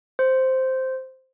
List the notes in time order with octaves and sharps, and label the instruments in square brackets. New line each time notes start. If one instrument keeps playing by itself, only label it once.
[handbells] C5